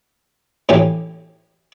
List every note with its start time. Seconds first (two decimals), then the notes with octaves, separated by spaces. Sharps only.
0.69 A2 E3 C#4 G4